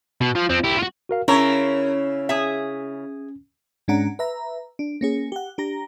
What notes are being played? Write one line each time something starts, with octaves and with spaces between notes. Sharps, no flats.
B2
F3
F3 C4
E4 G4
F4 F#4
F#4 A#4 F5
C#3 C#4 E4 A#4 C#5
G#4 E5
G#2 G#3 C#4 D4 F#5 A#5
B4 E5 A#5
D4
A#3 C#4 G#4
G4 F#5
D4 G4 A#5 A#6